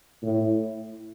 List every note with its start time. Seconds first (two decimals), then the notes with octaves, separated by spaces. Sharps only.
0.23 A2